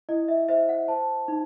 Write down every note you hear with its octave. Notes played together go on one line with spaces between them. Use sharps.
E4 D#5
E5
C5 E5
F#5
C5 A5
D#4